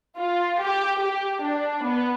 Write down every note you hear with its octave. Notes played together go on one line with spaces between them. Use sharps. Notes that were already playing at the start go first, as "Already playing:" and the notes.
F4
G4
G4
D4
B3